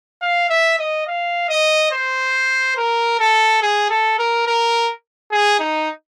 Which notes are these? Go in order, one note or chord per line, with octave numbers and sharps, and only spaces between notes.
F5
E5
D#5
F5
D#5
C5
A#4
A4
G#4
A4
A#4
A#4
G#4
D#4